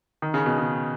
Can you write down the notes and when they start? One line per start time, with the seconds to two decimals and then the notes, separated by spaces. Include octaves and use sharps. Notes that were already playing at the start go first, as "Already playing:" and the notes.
0.22 D#3
0.34 C#3
0.46 B2
0.58 C#3